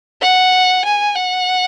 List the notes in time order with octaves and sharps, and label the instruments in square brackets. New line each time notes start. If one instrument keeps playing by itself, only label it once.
[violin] F#5
G#5
F#5